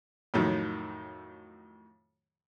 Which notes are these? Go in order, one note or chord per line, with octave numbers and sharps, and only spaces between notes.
F2 A2 D#3 F#3